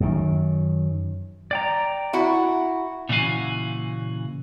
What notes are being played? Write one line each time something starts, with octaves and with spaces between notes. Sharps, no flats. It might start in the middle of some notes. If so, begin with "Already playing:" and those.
F#2 D#3
D5 G5 A#5
E4 F#4
A#2 C#3 E3 F#4 F5 G#5